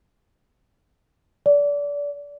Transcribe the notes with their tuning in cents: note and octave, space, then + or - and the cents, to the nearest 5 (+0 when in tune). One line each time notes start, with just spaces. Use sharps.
D5 -25